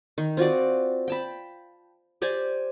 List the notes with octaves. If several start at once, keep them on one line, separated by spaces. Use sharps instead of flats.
D#3
C4 F4 F#4 D5
G5 A5 B5
G4 C5 D5 G#5